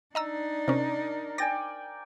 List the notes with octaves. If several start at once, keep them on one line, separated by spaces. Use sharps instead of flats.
D4 D#4 D#5 A#5 E6
C3 C#4 A#4
D5 G5 G#5 A6 A#6